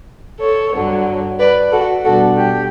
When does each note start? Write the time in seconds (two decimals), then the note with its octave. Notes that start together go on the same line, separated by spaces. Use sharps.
0.41 A4 C#5
0.74 G2 D3 F#3
1.40 B4 D5
1.72 F#4 A4
2.05 B2 G3 D4 F#4 A4
2.37 G4